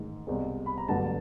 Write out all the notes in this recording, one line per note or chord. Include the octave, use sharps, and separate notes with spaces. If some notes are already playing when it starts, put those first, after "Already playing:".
Already playing: A1 G#2 D#3
C2 B2 G#3 C4
B5
A#5
A1 G2 D3 F#3 B3 A5